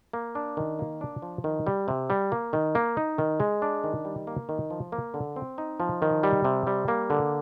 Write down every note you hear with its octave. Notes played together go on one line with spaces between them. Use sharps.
A#3
D4
D#3
A#3
D4
F3
D#3
G3
C3
G3
A#3
D#3
A#3
D#4
D#3
G#3
D4
D#3
G3
A#3
D#3
F3
A#3
D3
C4
D#4
F3
D#3
G3
C3
G3
A#3
D3